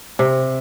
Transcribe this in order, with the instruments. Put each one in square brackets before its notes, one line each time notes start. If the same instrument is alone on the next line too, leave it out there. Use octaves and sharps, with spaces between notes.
[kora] C3